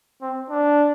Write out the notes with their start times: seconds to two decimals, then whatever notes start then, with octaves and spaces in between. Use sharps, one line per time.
0.22 C4
0.50 D4